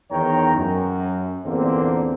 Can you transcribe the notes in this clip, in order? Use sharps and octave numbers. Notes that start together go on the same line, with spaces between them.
E2 D#3 C#5 G5 A#5
F#2
E2 A#2 D3 A#3 C4